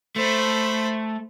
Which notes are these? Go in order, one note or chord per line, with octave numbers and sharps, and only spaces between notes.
A3 C5 B5